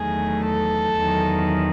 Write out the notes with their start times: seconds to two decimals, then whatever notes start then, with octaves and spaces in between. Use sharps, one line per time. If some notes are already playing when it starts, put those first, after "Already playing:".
Already playing: E2 D#3 F#3 A3 G#4
0.45 A4
0.98 E2 D#3 F#3